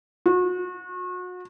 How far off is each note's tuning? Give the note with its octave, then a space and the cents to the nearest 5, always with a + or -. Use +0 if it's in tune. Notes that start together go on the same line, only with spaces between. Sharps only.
F#4 -35